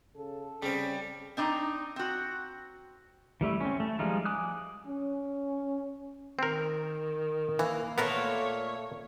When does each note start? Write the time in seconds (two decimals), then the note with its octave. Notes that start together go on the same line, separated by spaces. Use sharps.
0.16 C#3 A4
0.62 C#3 G3 C4 C#4
1.37 C4 D4 D#4 A#5
1.96 C4 F#4
3.41 E3 G3 A3 E4
3.60 C4 C#4
3.80 A3
3.99 F3 G3 G#3 D#4 F4
4.25 G#5 D6 D#6 F#6
4.88 C#4
6.39 D#3 C4 A#4
7.59 E3 A#3
7.98 A#2 A3 B3 A#4 C#5 F5